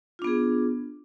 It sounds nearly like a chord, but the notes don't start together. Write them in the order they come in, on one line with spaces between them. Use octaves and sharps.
F4 D4 B3 G#4